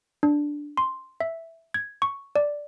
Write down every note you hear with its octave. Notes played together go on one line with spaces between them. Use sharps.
D4
C6
E5
G#6
C#6
D5